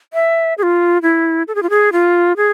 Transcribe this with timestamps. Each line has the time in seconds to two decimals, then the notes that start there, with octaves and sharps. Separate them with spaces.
0.14 E5
0.58 G#4
0.63 F4
1.02 E4
1.48 A4
1.55 G#4
1.63 F4
1.70 G#4
1.93 F4
2.37 G#4